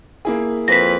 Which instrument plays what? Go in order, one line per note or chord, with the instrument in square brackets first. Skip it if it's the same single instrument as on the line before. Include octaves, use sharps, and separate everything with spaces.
[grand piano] A#3 E4 G#4
[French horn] F2 [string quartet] B4 [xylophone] A#6 B6